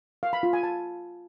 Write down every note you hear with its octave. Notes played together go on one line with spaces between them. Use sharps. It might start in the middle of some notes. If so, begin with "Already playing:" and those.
F5
B5
F4
G#5
A5